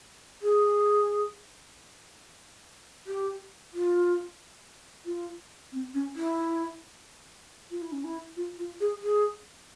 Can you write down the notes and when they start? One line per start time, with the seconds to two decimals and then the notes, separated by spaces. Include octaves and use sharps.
0.42 G#4
3.07 G4
3.74 F4
5.06 F4
5.72 C4
5.94 C#4
6.16 E4
7.71 F4
7.82 E4
7.92 C#4
8.04 E4
8.37 F4
8.58 F4
8.80 G#4
9.03 G#4